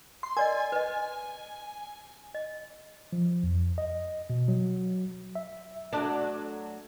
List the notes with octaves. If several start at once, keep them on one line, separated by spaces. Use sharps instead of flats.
C6
A#4 D5 D#5 G#5
B4 D#5
D#5
F3
F2
D#5
B2
F#3
E5
F#3 A3 D4